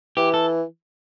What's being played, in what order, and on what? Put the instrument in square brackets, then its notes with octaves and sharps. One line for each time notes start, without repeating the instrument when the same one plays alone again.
[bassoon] E3 [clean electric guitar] G4
[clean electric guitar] A4